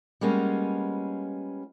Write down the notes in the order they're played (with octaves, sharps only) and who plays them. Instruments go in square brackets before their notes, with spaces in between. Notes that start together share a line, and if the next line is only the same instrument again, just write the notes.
[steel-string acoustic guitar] G3 G#3 A#3 B3 C#4 F4